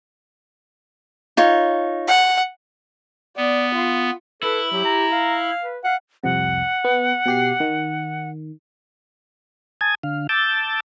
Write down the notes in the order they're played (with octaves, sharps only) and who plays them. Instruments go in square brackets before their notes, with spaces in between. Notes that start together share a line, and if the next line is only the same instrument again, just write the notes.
[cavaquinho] D#4 F4 C#5
[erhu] F#5
[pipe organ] B3 [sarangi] D5
[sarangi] F4
[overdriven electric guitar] E4 [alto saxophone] A4 [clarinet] B4
[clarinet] F#3 [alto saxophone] G4
[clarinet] A#5
[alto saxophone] F5
[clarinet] B4
[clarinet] F5 [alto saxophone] F#5
[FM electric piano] C2 F2 C3 [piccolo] F#5
[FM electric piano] B3
B2 G4 C7
D#3
[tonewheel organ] G#5 A5 D#6 G#6
D3 F5
A5 D6 E6 G6 A6